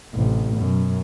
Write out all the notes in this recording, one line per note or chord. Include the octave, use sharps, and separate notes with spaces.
A1 C3
F#2 B2